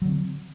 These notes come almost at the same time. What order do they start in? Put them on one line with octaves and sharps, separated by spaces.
F#3 D3 C4